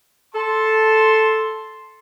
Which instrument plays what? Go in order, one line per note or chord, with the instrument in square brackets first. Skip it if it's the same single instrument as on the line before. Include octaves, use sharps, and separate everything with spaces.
[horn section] A4 A5 C6